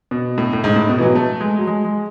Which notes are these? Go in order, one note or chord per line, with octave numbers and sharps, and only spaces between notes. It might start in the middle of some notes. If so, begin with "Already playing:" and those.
B2
A2
A2
G#2
A2
B2
E3
F#3
A3
G#3
F#3
G#3
G#3